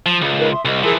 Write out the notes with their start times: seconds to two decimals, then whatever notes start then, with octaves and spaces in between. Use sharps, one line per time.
0.06 F3
0.21 C#2
0.38 D#4 A#4 B4
0.52 E5 C6 D#6
0.65 C2 D#5
0.83 E3 F3 G#4 A#4 E6